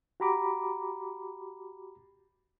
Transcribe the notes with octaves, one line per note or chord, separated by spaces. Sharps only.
F#4 G4 A#5 B5 D6